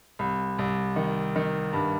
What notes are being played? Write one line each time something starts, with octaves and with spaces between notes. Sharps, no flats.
C2
C2
D#3
D#3
G2